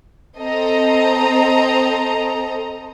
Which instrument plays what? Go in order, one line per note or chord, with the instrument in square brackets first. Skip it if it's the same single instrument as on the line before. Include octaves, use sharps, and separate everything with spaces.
[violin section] C4 A4 D#5 A#5